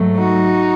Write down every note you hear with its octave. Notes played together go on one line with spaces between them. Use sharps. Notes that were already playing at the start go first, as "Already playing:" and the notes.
Already playing: G#2 F#3 A3
D#4 F#4